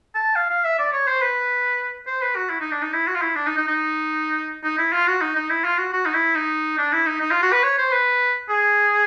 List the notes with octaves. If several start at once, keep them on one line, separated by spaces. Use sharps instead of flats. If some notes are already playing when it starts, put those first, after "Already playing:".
A5
F5
F5
E5
D5
C#5
C5
B4
C5
B4
F#4
E4
D#4
D4
D#4
E4
F#4
F4
E4
D4
D#4
D#4
D#4
D#4
E4
F4
F#4
D#4
D#4
E4
F4
F#4
F#4
D#4
E4
D#4
D4
E4
D#4
D#4
F4
F#4
B4
C#5
C5
B4
G#4